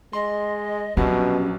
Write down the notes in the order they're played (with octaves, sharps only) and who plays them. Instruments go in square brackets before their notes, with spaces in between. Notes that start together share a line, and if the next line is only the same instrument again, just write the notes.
[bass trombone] G#3 [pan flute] D#5 [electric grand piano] C6
[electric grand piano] A#1 F#3 [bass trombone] B2 [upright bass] C#4 [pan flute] G4